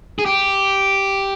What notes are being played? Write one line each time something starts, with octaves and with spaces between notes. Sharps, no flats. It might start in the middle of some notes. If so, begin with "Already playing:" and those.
G#4
G4